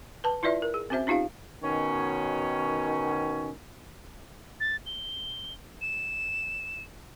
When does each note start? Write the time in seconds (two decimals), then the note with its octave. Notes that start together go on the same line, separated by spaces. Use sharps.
0.24 B4 A5
0.43 E4 F4 B4 D5 E5
0.62 A#4
0.74 G#4
0.90 C4 C#4 F#4 C5 E5
1.07 C#4 D#4 F4 G4 F5
1.63 B2 D#3 C#4
4.60 A6
4.86 G7
5.81 E7